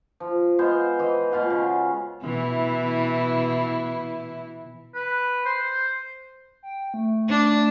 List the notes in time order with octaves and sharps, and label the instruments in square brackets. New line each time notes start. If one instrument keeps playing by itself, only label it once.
[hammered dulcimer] F3
G#3 B3 C5 F5
E3 C5 D#5
B2 F4 F5 F#5
C#3
[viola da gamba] B2 E3 E4
[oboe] B4
C5
[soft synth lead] G5
A3
[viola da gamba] D4